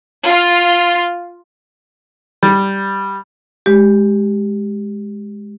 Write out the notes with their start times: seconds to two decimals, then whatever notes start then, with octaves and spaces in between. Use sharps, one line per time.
0.25 F4
2.43 G3
3.66 G#3 G4